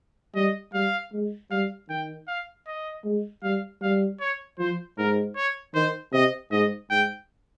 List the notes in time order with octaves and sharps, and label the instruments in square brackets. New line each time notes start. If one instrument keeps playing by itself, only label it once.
[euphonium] G3 [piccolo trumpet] D#5
[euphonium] G3 [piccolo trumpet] F5
[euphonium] G#3
[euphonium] G3 [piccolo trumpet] F5
[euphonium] D#3 [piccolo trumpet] G5
[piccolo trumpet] F5
D#5
[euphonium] G#3
[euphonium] G3 [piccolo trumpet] F5
[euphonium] G3 [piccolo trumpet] F5
[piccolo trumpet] C#5
[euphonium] F3 [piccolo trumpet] C5
[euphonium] G#2 [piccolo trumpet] A#4
[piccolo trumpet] C#5
[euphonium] D#3 [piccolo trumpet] C5
[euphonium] C3 [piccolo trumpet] D#5
[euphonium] G#2 [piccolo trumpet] D#5
[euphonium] G#2 [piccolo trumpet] G5